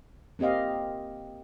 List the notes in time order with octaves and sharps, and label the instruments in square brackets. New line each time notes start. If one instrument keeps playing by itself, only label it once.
[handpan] A#3 C4 G4 D#5 F5